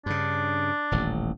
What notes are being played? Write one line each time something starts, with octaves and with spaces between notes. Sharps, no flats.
G2 C#3 D4
D#1 A1